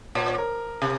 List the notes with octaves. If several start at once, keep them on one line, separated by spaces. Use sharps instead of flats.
A#2 C#5
C#5
A#4
C3